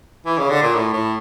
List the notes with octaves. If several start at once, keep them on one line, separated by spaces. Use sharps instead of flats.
E3
C#3
D3
A#2
A2
A2